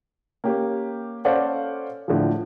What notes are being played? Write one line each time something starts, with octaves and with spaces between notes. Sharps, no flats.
A#3 C#4 G4
C#4 A4 C5 D5 F5 F#5
A2 D3 F3